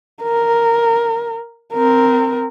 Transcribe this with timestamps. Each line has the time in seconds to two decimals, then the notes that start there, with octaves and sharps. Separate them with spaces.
0.23 A#4
1.74 C4 A#4